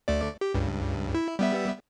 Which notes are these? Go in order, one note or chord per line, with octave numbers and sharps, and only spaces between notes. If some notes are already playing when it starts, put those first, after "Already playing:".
D2 A3 D5
G4
C#2 G2
E4
G3 B3 E5